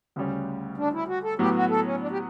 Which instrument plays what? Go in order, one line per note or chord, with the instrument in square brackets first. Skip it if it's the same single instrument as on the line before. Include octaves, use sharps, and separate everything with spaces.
[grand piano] D2 C#3 G3 C#4
[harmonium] D4
E4
F#4
A4
[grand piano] A2 F#3 B3 [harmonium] G4
[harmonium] F#4
A4
C#4
D4
G4